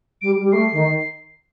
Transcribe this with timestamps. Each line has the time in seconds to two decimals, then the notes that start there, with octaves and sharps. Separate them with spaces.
0.22 G3 D7
0.41 G3
0.53 A3 C7
0.73 D#3